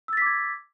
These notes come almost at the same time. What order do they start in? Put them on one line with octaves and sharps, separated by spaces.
E6 A6 B6 D6 G#6